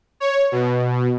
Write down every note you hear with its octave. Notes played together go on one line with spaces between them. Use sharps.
C#5
B2